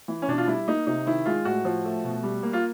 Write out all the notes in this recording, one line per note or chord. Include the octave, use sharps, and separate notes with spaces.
E3
C#4
B2 D4
F4
G3 E4
A#3 D#4
C3 D#4
D#3 E4
G#3 F4
A2 F#4
F3
A3
B2
G3
A#3
F4